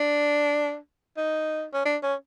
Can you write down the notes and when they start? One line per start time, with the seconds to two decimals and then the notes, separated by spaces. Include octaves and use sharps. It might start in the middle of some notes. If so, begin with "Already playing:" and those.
Already playing: D4
1.17 D#4
1.73 C#4
1.85 D4
2.03 C#4